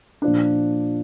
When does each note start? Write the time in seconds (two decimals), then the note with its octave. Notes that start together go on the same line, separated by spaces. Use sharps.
0.22 A#2 F3 D4